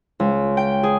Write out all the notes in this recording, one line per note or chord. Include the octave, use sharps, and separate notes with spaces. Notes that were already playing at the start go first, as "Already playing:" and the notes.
C#2
G5
G#4